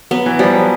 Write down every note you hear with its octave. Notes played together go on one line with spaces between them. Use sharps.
F#3 B3
E3
F3 G3
F#3